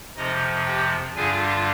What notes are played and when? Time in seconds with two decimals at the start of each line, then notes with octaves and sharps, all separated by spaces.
0.17 F2 C3 F3 D#4 D#5
0.66 G4 G5
1.15 G2 D3 G3 D4 F4 G#4 G#5